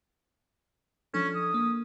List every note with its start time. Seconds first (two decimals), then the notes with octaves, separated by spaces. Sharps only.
1.14 F3 C#4 D4 A4
1.35 D#6
1.54 A#3